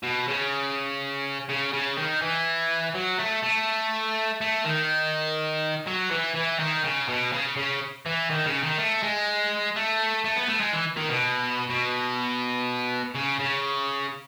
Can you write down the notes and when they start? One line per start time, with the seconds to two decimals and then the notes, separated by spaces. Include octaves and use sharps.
0.03 B2
0.28 C#3
1.49 C#3
1.73 C#3
1.97 D#3
2.22 E3
2.95 F#3
3.19 A3
3.43 A3
4.41 A3
4.65 D#3
5.87 F#3
6.11 E3
6.36 E3
6.59 D#3
6.84 C#3
7.09 B2
7.33 C#3
7.57 C#3
8.06 E3
8.30 D#3
8.46 C#3
8.62 D#3
8.78 A3
9.03 G#3
9.76 A3
10.25 A3
10.36 B3
10.49 A3
10.61 G#3
10.73 E3
10.97 D#3
11.09 B2
11.70 B2
13.15 C#3
13.40 C#3